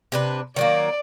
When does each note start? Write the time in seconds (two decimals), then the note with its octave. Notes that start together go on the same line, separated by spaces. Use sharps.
0.12 C3 D4 B4
0.56 D#3 F#3 A#3 D5